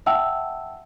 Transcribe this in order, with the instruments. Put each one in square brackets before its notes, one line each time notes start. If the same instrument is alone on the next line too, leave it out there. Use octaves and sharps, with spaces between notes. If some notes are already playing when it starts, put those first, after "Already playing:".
[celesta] E5 F#5 G5 A5 E6